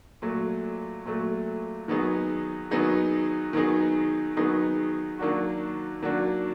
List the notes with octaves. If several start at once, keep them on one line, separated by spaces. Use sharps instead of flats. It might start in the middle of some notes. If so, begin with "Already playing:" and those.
A#2 F#3 A3
A#2 F#3 A3
D#3 F#3 B3 D#4 G#4
D#3 F#3 B3 D#4 G#4
D#3 F#3 B3 D#4 G#4
D#3 F#3 B3 D#4 G#4
D#3 F#3 A#3 D4 F#4
D#3 F#3 A#3 D4 F#4